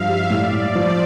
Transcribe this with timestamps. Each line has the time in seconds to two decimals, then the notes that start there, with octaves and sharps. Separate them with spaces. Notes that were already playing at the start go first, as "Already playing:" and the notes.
Already playing: G2 F3 E5 F5
0.09 G3
0.30 A2 D5
0.53 A2
0.75 F3 C5